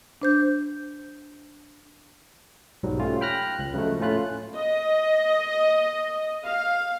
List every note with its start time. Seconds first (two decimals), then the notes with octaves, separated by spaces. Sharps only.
0.22 D4 C5 G6
2.83 B1 G#2 F#3 G3
2.99 A3 C#4 F4 G4
3.21 G5 B5 F6 F#6 A#6
3.59 C#2 F#6
3.74 C#3 F3 F#3 G#3 A3
4.00 A2 A3 C#4 F4 B5 F#6
4.54 D#5
6.45 F5